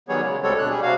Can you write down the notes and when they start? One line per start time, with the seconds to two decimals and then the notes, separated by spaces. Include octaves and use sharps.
0.09 D#3 F#3 G3 B3 G#4 C#5
0.21 C#3 G#3
0.43 D2 G3 G#3 C4 A4 C#5
0.58 B2 D4 F#6
0.69 G3 G#4
0.83 C3 F#4 F5